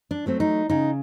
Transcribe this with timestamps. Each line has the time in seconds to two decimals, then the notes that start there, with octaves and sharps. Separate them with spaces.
0.11 D4
0.26 F#3 A3 C4
0.40 D#4
0.69 C#3 D#4